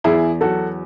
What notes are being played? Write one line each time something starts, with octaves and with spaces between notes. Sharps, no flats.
E2 E4 G#4
F#3 F#4 A4